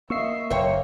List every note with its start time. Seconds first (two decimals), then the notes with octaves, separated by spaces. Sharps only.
0.10 A#3 D#5 E5 C#6 E6 C7
0.51 F#1 A#3 C5 C#5 E5 G5